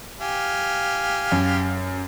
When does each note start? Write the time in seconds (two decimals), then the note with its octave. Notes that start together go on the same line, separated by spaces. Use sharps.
0.20 G4 F5 G#5
1.32 F#2